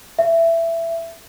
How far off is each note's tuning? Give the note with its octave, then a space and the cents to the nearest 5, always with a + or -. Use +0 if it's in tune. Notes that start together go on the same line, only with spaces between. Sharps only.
E5 +15